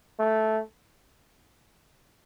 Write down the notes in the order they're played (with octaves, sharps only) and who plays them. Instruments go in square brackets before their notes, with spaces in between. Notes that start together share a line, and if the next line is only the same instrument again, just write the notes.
[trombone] A3